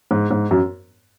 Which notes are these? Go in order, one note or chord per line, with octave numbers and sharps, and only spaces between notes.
G#2
G#2
F#2